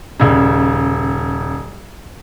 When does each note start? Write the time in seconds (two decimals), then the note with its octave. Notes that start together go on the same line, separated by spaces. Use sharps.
0.20 D#1 C#3